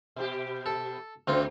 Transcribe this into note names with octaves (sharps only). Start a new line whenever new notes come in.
B2 G4
A4
D2 C#3 C4 F4